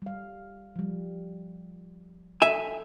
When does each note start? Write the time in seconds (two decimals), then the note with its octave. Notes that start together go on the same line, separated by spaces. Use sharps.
0.02 G3 F5
0.76 F3 G3
2.42 A4 E5 G#5